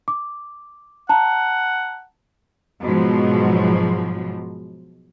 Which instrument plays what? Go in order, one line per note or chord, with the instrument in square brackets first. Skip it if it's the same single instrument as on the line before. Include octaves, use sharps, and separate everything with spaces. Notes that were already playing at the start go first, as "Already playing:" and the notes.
[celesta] D6
[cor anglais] F#5 [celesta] A5 A#5
[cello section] G#2 B2 F3 F#3 G#3